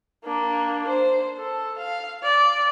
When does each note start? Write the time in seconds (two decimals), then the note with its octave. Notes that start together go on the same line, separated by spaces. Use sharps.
0.25 A#3 D4
0.88 C5
1.37 A4
1.78 F5
2.23 D5